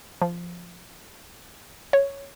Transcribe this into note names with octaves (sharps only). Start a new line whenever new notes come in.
F3
C#5